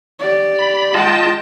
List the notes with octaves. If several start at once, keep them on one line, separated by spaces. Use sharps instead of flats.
G4 D5
B5
G#3 F4 D#5 G5 A5